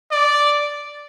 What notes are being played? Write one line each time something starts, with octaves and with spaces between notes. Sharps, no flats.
D5